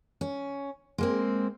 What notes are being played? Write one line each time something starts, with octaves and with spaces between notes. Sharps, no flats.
C#4
G#3 A#3 C4